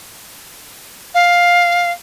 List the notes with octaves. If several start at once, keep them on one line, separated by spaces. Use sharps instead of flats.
F5